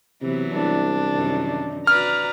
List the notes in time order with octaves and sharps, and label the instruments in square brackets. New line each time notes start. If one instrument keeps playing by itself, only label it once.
[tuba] C3 [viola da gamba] E3 F#3 B3
[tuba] C2 [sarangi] D4
[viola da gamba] F#2 C3 D#3
[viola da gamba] F#4 B4 D5 [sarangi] A#5 [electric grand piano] F6